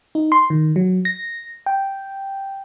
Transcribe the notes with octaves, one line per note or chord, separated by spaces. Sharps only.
D#4
C6
D#3
F#3
A#6
G5